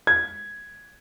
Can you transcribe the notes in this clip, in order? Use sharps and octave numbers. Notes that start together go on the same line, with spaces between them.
G#6